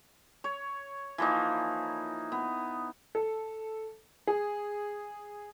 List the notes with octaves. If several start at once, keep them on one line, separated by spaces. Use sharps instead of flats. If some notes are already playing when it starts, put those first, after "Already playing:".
C#5
E3 F3 A#3 D#4
B3
A4
G#4